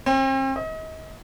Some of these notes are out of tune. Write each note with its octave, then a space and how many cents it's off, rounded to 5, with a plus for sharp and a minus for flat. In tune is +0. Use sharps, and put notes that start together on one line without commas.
C4 +40
D#5 +35